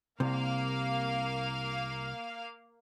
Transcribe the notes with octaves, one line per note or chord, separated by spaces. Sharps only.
C2 C3 A#3 F5